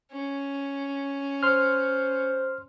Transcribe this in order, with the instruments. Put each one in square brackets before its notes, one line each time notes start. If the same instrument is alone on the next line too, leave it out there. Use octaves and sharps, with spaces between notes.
[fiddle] C#4
[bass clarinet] C5 [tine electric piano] C6 F6